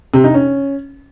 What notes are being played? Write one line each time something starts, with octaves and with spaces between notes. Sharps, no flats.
C3
D#4
C#4